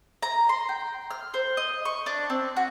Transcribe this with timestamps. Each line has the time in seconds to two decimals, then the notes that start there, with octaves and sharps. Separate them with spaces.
0.23 A#5
0.49 C6
0.69 G5
1.11 F6
1.34 C5
1.57 D#5
1.85 C#6
2.06 D4
2.30 C4
2.56 F#4